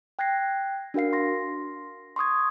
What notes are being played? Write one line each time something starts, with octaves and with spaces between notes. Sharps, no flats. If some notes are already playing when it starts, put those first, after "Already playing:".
G5 F#6 G#6 A#6 C7
D4 F#4 A#4 F5 C7
C6 A#6
C6 C#6 D#6 G#6